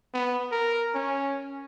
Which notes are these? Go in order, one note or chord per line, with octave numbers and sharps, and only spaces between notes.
B3
A#4
C#4